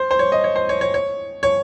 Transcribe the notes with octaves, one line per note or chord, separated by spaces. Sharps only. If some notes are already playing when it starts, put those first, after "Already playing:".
Already playing: C5
C5
C#5
D#5
C#5
C5
C#5
C#5
C#5
C#5